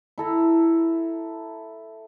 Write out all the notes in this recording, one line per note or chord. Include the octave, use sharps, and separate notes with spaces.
E4 A4 A#5